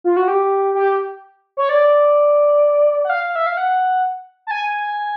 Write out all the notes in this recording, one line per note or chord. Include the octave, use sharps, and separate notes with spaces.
F4
F#4
G4
G4
C#5
D5
F#5
F5
E5
F5
F#5
A5
G#5